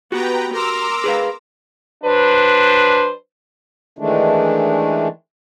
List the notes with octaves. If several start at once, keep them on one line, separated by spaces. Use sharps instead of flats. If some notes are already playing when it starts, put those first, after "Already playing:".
B3 F#4 G4 B4 G5 A#5
A#4 A#5 C6 D6 E6
G#4 B4 F5
F#3 D4 B4 C5
D#3 E3 G#3 A3 D4